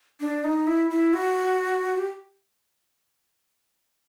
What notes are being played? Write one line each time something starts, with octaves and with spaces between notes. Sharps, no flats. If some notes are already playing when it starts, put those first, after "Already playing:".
D4
D#4
E4
E4
F#4
G4